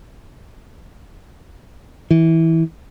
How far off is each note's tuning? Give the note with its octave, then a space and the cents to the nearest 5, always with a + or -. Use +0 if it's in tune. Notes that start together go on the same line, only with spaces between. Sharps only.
E3 -15